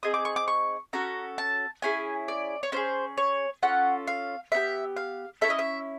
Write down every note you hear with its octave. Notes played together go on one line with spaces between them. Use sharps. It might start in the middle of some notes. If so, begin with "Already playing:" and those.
C4 D#4 G#4 D#6
D6
C#6
D6
C#6
C#4 F#4 A4 A#5
A5
C#4 E4 G#4 G#5
D5
C#5
C#4 F4 G#4 C5
C#5
C#4 F4 A4 F#5
F5
B3 D#4 G4 E5
F5
C#4 E4 A4 E5
D#5
E5